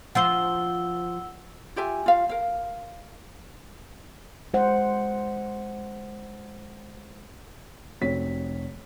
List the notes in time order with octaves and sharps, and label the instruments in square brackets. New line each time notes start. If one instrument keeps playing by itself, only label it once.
[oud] F3 F4 C5 [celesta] F#5 E6 G7
[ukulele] F4 G4 E5 G#5
F4 F5
A#4 F5
[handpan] G#3 C5 F#5
[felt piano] F1 C4 F#4 C#5 B6